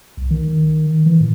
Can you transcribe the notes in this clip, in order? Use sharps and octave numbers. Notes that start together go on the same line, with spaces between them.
C2
D#3
E3
A2